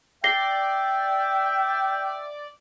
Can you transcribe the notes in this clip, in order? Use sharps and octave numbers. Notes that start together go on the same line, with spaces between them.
D5 E5 G5 A#6 C7 G7